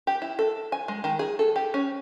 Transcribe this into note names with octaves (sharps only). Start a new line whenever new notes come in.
G4
E4
A4
G#5
G#3
D#3
G#4
A4
G4
C#4